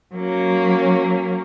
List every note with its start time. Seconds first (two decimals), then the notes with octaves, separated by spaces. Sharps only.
0.14 F#3 A#3 C#4